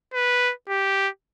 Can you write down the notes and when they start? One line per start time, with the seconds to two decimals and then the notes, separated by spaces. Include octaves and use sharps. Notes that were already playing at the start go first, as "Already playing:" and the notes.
0.14 B4
0.69 G4